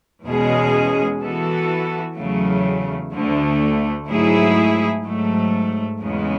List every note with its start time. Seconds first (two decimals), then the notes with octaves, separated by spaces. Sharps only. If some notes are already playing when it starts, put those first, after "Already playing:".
0.25 E2 B2 G#3 C#4 G#4
1.21 E3 B3 F#4 A4
2.17 E2 C#3 F#3 A3
3.12 D2 D3 A3
4.08 G#2 F#3 A3 E4 G#4
5.05 G#2 F#3 A3
6.01 E2 C#3 G#3 B3